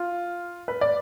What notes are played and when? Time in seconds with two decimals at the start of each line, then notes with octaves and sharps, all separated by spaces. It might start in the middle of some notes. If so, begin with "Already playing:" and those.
Already playing: F4
0.68 B4
0.81 D5